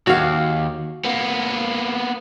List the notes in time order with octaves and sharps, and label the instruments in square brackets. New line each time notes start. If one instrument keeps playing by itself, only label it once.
[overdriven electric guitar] D#2 [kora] F#4 F5
[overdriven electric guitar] A#3 B3